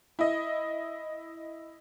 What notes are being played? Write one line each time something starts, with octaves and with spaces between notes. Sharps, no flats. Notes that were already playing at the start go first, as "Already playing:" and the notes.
E4 D#5